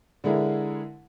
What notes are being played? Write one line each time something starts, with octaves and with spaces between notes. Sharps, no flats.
D3 G#3 E4 G#4 A#4